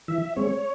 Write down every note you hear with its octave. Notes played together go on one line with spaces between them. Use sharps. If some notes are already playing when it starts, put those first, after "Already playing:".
E3 E5
G#3 C4 C#5